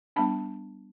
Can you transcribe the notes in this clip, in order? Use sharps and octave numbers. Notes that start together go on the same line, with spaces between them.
G3 B3 D4 A5 B5